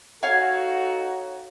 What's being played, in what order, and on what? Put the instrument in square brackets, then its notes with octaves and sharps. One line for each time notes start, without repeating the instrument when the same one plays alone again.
[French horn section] D#4 F#4 A4 [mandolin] C#5 F5 G#5 [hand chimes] F#5